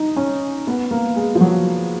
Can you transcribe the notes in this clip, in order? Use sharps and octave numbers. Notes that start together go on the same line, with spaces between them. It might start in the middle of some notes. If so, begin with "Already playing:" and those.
Already playing: D#4
C#4
B3
A#3
G#3
F3
F#3